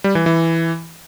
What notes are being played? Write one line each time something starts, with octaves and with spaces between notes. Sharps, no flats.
G3
E3
E3